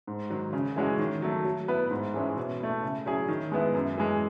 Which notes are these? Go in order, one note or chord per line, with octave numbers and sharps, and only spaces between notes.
G#2
D#3 F#3
C#3
E3 G#3 C#4 F#4
D#3
F#3 A3
F#3
B3 E4 B4
G#2
E3 G#3 C#4 E4
B2
A3 E4
C#3
F#3 C#4 E4 G#4
D#3
G#3 B3 E4
F#2
E3 G#3